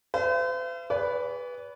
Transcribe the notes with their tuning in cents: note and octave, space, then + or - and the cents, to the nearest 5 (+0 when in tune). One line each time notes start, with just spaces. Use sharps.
C5 -45 E5 +45
G#4 -40 B4 +0 D5 -45